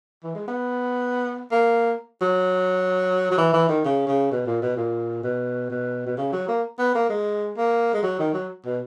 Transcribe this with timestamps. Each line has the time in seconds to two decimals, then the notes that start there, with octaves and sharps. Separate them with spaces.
0.24 E3
0.35 G#3
0.48 B3
1.51 A#3
2.21 F#3
3.31 F#3
3.38 E3
3.53 E3
3.69 D#3
3.85 C#3
4.07 C#3
4.31 B2
4.46 A#2
4.62 B2
4.77 A#2
5.23 B2
5.70 B2
6.06 B2
6.17 C#3
6.32 F#3
6.48 A#3
6.79 B3
6.95 A#3
7.09 G#3
7.57 A#3
7.94 G#3
8.03 F#3
8.19 D#3
8.34 F#3
8.66 B2